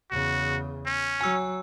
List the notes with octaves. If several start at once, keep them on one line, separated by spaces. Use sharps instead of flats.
E2 C#3 F#4
C#4
F#3 G#5 E6